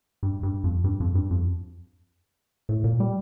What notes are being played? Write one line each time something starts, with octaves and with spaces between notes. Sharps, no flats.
G2
G2
F2
G2
F2
G2
F2
A2
A#2
G3